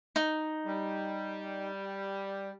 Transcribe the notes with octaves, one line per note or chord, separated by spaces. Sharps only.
D#4
G3